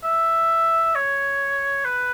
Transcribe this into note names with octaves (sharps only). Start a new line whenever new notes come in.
E5
C#5
B4